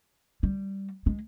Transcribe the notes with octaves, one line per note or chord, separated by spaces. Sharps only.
G3
G#3